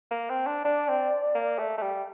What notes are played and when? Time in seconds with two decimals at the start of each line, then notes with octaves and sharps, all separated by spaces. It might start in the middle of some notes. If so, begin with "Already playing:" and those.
0.11 A#3
0.30 C4
0.46 D4
0.64 D4 D5
0.89 C4
1.35 A#3
1.58 A3
1.78 A3
1.82 G3